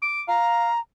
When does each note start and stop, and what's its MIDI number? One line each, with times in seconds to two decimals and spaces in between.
0.02 0.22 86
0.28 0.71 77
0.28 0.80 82